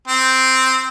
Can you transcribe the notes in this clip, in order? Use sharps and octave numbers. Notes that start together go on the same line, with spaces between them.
C4